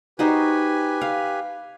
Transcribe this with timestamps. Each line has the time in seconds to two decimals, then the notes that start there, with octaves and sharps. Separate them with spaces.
0.19 D#4 F#4 G4 B4 C5 G#5
1.01 F5